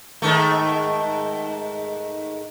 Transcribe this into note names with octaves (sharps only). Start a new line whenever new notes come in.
G#2 D#3 A3